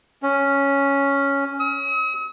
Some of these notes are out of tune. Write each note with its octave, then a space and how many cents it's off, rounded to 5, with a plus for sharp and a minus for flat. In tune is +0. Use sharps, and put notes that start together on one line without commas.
C#4 +5
D#6 +45